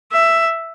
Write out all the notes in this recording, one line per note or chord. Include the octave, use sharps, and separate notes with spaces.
E5